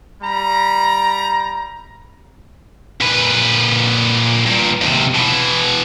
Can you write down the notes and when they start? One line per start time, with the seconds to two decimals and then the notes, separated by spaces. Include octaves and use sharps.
0.21 G3 A#5 B5
3.01 A#2 B4
4.46 G2 A#2
4.81 D#2 C3
5.14 B2 E3